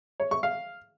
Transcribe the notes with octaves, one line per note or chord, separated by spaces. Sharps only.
C#5
C#6
F5